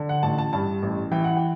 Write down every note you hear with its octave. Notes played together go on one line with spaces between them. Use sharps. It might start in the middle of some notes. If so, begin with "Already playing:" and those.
Already playing: D3
F#5
A1 A5
A5
G2 A5
A1
E3 G5
F#5
G5